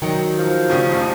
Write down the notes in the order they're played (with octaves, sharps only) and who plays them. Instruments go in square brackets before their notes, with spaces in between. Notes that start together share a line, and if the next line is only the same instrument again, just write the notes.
[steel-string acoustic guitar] D#3 [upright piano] F#3 C#7 [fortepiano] D#4 G5
[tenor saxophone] F3
[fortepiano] A2 C#3 G3
[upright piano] D#1 A1 F2